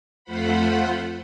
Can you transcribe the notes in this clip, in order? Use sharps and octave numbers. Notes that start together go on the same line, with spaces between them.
F2 A3 F4 C5 F#5 B5